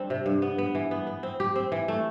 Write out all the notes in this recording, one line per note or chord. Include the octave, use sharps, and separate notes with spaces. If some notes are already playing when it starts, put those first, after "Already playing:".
Already playing: G3 C4 D4
C3
G2
B3
B3
E3
B3
B3
C4
G4
C4
E3
A3